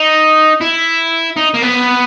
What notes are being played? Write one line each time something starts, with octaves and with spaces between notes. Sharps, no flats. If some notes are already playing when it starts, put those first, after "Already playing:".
Already playing: D#4
E4
D#4
A#3
B3